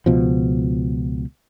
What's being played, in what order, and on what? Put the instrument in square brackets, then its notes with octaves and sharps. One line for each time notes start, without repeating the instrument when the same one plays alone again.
[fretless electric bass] C#2 B2 F3